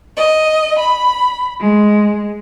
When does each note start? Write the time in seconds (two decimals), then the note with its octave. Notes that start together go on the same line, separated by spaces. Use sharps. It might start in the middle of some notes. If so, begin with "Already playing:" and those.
0.16 D#5
0.78 B5
1.60 G#3